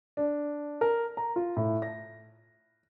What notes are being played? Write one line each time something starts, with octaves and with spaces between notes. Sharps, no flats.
D4
A#4
A#5
F4
A2
A#6